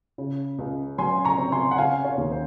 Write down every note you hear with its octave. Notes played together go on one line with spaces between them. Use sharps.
C#3
C#2
F#3 G#5 C6
A#5 C#6
C4
G#5 C6
F#5
C#3 F5 G#5
C#5 F5
D#2
C5